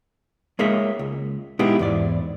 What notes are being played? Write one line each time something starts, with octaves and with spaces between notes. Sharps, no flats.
G#3 A#3 G#4 C#5 D#5 E5
C#2
A#2 G#3 B3 D#4 E4 G4
E2 G#2 D5